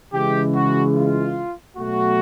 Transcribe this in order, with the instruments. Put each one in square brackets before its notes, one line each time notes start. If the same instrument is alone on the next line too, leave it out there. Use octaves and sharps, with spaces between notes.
[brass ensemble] C#3 E3 G#3 G4
F#4
F4
B2 F#3 A3 F#4